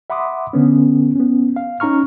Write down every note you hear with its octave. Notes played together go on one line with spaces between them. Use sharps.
E5 F#5 B5 C6 D6 D#6
D3 B3 C#4
B3 C#4
F5
C#4 D#4 A#5 C#6 F6